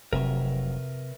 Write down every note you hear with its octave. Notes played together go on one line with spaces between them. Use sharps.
F1 C3 F#3 A#4 B4 E5